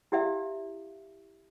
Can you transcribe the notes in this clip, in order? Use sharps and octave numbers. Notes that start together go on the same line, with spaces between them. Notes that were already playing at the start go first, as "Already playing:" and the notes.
E4 G4 D5 E5 F5